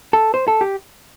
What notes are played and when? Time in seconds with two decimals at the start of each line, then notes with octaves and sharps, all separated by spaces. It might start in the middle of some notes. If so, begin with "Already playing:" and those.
0.13 A4
0.34 C5
0.48 A4
0.61 G4